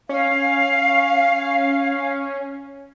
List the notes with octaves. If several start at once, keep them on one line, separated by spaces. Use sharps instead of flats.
C#4 F5